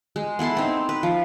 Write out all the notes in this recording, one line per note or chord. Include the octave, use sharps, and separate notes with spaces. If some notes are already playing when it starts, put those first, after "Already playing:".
G#3
B3 E4 A4 C6
C4 D#4
B4
F3